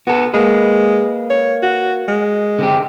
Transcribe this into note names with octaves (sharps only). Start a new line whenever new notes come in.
B3 F#4 A4
G#3 A#3 B4
C#5
F#4
G#3
D3 C4 G4